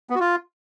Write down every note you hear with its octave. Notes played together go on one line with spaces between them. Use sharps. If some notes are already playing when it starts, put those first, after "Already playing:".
B3
F#4
F4